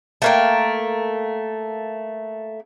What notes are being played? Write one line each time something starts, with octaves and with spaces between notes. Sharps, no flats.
A3 A#3 G5